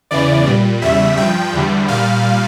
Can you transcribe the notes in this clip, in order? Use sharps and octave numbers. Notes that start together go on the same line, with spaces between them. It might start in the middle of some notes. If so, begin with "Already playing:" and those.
E2 C#3 E3 D5
A#2 G3
E2 C#3 G3 E5
G2 F3 G5
E2 D3 G3
A#2 G3 F5